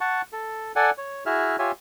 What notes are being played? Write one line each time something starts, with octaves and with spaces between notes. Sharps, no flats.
F#5 A5 C#6
A4
A4 D5 F#5 G#5
C#5
E4 F#4 G#4 E5 F6
F4 G4 C#5 E5 G#5